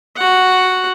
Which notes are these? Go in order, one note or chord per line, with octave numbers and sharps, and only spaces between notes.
F#4 F#5